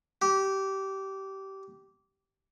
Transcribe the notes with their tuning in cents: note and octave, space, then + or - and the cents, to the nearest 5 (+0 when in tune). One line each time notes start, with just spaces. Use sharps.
G4 -20